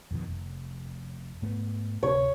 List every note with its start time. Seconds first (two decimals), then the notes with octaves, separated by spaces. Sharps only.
0.11 F2 B2 D#3
0.27 F1
1.42 G#2 A3 B3
2.03 D1 C3 C#5